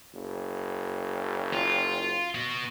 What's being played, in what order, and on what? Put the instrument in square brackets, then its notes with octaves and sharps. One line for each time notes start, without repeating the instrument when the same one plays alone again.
[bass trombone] F#1
[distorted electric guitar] F4
B3 F#4